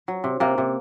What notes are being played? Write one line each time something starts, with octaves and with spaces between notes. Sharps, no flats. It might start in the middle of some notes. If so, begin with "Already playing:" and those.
F#3
C3
C3 A#3
C3